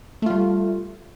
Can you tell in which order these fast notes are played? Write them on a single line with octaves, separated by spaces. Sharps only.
A3 F4 G3